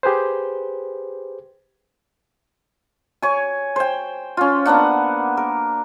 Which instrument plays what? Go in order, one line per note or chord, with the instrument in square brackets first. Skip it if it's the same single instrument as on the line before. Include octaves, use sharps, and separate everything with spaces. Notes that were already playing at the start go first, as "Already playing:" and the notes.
[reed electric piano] G4 G#4 B4 C5
[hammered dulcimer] C#5 G#5
C5 G5
C#4 F4
A#3 B3 D4 F#5
A#4